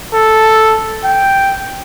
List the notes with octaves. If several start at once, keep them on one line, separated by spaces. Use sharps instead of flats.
A4
G5